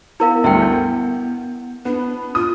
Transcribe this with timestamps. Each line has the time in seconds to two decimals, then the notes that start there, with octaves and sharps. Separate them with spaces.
0.20 B3 E4 A#4 F5
0.44 D2 G2 E5 G5
0.62 G6
1.85 B3 D4
2.35 F4 D#6